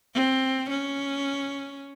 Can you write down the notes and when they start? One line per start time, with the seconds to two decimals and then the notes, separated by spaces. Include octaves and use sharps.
0.15 C4
0.70 C#4